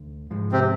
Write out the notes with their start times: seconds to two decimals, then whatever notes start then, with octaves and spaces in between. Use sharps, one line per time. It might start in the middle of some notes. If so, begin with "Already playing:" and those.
Already playing: D2 D3
0.30 G#2 F3 G#3
0.52 C3 C4